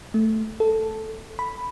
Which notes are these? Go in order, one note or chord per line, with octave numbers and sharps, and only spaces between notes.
A3
A4
B5